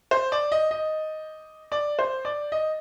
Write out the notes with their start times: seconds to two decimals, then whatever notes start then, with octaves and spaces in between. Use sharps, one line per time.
0.11 C5
0.32 D5
0.52 D#5
0.71 D#5
1.72 D5
1.99 C5
2.25 D5
2.52 D#5